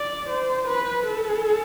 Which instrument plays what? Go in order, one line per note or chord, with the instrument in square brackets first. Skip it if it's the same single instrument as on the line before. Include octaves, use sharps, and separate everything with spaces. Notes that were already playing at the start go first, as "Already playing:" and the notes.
Already playing: [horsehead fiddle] D5
C5
B4
A4